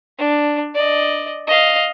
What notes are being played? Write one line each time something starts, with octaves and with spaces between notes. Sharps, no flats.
D4
D5 D#5
D#5 F5